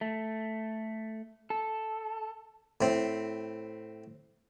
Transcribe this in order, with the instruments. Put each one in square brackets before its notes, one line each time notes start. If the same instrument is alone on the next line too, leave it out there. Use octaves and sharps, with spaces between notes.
[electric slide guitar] A3
A4
[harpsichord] A2 C4